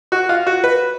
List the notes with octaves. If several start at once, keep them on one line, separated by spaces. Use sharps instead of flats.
F#4
F4
F#4
B4